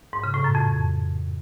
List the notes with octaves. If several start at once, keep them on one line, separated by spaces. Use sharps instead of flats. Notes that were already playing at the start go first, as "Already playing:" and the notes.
G#2
C#3
A2
F#2
F2